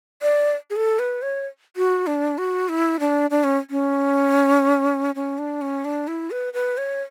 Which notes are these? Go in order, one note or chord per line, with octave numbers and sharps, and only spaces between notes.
D5
G#4
A4
B4
C#5
F#4
D4
F#4
E4
D4
D4
C#4
C#4
C#4
D4
C#4
D4
E4
B4
B4
C#5